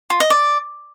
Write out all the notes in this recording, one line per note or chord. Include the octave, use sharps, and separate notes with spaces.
F4
D#5
D5